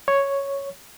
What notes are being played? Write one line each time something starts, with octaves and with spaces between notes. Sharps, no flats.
C#5